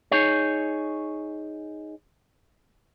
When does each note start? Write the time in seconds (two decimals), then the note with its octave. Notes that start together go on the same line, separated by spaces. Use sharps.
0.11 D#4 G#4 C#5